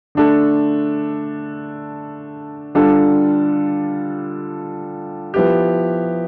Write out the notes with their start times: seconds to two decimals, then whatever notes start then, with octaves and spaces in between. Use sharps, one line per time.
0.15 D3 A3 D4 A4
2.75 D3 G3 D4 F4 A4
5.34 F3 B3 E4 G4